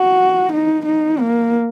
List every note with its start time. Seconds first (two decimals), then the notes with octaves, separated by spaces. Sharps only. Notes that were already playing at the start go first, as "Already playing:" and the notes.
Already playing: F#4
0.52 D#4
0.85 D#4
1.19 A#3